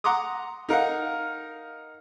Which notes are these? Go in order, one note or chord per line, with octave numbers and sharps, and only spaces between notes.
F#5 A#5 C6 D6 D#6
D#4 A#4 F5 F#5